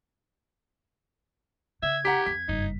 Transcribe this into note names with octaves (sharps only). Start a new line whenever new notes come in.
C#3 E5 G#6
G4 F#5 A#5 B6
F2 B6
F#1 G2 D#4